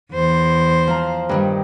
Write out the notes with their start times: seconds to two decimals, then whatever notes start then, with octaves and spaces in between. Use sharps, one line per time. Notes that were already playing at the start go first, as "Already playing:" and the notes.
0.13 E2 C5
0.87 F3 A#5
1.29 G2 D#3 G3